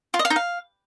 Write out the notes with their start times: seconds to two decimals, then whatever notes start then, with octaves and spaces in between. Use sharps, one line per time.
0.14 F4
0.19 D#5
0.25 F5
0.30 D#4
0.36 F5